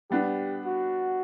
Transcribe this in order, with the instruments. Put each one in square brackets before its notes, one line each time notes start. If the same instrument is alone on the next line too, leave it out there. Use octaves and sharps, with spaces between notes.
[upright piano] G3 B3 D4 [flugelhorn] G4
[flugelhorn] F#4